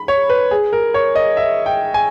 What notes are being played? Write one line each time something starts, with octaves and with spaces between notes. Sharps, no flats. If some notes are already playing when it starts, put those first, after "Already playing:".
Already playing: B5
C#5
B4
G#4
A#4
C#5
D#5
E5
G5
G#5